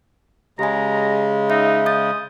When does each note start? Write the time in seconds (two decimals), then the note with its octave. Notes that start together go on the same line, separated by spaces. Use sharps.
0.59 C#3 G#3 G4 G#5 A#5
1.50 D#4 E5
1.86 D#6 G6 A6